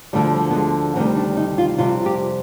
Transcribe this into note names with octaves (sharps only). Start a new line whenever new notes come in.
D2 D3 F3 G3
G3
B3
G#3
D2 C3 D#3 G3 C4
D4
D#4
F4
F2 C3 G3 F4
G4